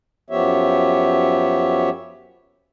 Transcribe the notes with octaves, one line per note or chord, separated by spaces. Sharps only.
F#2 F3 B3 G4 C#5 E5